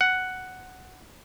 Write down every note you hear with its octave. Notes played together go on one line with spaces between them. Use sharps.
F#5